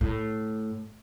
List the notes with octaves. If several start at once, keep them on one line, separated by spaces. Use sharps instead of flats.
A2